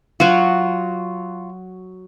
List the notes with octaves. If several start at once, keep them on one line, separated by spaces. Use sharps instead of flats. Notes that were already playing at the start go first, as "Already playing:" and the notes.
F#3 F4 F#4